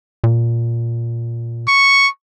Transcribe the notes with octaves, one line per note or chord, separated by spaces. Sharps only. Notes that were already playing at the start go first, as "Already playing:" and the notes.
A#2
C#6